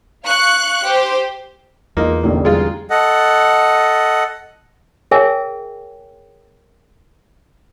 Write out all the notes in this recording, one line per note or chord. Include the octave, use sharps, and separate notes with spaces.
F5 C#6 F#6 C#7
G4 C5
E2 A#3 D#4 F4 D#5
F1 A#1 D3 C#4 D#4 G4
G3 G#3 F4 G#4
A4 D#5 F#5
G#4 A#4 C#5 E5 G5 G#5